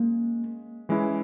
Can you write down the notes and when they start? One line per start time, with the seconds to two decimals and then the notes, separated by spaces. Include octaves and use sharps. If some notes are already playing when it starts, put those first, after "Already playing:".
Already playing: G#3 A#3 C#4
0.89 E3 G#3 C#4 E4